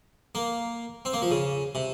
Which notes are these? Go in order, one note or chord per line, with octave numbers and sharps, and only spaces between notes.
A#3
C4
A#3
F3
C#3
C3